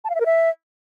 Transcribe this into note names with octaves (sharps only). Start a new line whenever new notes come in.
A5
F5
E5
A#4
E5